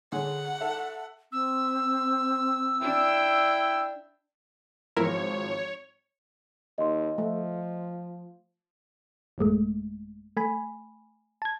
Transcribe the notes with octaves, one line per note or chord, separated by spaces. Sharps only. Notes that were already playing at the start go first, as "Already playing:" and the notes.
D3 G#4 C#5 F#5
A4 E5
C4 E6
D4 E4 G5
G#1 F3 E4 A#4 C#5
D#2 D#5 C6
F3 A3
A1 F#2 G#3 A3
A3 G#5 B5
A5 G#6